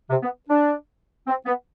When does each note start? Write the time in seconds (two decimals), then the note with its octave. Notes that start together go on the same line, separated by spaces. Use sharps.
0.10 C3
0.23 B3
0.49 D4
1.27 C4
1.46 B3